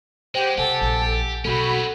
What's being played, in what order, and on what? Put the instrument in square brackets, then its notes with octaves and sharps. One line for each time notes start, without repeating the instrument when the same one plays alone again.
[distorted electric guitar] G#3 [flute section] G4 F#5 G5 [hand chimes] C5
[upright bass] C3 [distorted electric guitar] G4 [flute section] A4 [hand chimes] F#5 G#5
[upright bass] A#1
[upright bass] B1 [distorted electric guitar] C4 C#4 [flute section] F#4 B5 [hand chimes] A4 F#5